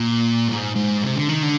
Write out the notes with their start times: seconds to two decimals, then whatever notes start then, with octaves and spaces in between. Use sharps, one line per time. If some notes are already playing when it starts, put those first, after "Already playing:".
Already playing: A#2
0.48 G#2
0.75 G#2
1.02 C3
1.15 D3
1.29 D#3
1.43 D3